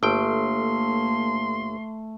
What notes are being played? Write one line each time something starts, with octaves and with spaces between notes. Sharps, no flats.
G1 A3 A#3 G5 C6